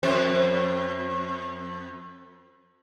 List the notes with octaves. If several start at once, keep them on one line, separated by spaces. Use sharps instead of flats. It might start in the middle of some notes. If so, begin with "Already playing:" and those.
F2 C4 C5